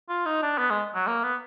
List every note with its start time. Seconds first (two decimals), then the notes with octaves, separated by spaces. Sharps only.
0.09 F4
0.26 D#4
0.42 D4
0.58 B3
0.70 G#3
0.95 F#3
1.07 A#3
1.23 B3